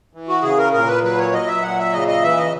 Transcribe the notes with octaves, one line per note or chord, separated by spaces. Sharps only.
E3
F#4
C#3 G#4
A#4
A#2 A#4
B4
F#3 B4
C#5
F#3 D#5
E5
A#2 F#5
E5
C#3 D#5
D#5
E3 E5
D#5